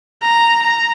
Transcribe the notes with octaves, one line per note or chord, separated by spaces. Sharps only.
A#5
A#5